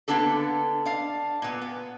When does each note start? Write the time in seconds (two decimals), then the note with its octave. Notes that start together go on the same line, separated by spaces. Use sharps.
0.08 D3 A#3 B3 D4 G4 A4
0.85 D4 F5
1.42 A#2 B3
1.62 B3